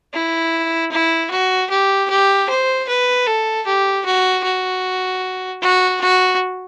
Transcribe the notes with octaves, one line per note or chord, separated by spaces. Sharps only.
E4
E4
F#4
G4
G4
C5
B4
A4
G4
F#4
F#4
F#4
F#4